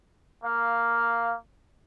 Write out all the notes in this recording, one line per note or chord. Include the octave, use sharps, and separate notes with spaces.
A#3 F5